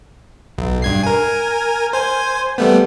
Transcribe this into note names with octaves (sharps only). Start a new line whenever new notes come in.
B1
G2 G#6 C7
A#4 G#5
C5 G#5
G3 A3 B3